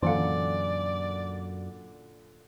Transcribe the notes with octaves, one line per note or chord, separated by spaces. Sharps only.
F#2 A#2 D3 E3 D5 F5